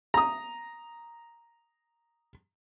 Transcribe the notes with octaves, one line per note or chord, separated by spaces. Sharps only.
A#5 D#6